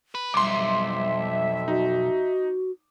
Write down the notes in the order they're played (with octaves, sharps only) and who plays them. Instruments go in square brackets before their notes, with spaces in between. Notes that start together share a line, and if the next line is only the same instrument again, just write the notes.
[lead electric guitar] B4
[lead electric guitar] B1 [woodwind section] F2 F3 E5 [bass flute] G3 [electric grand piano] C6 D6
[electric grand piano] D#4 [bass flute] F#4